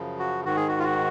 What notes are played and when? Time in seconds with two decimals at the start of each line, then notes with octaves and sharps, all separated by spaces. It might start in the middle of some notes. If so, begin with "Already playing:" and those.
Already playing: F#2 C#3 F3
0.19 F#4
0.45 G#2 D#3 F#4
0.56 G#4
0.68 F#4
0.79 F4
0.83 F#4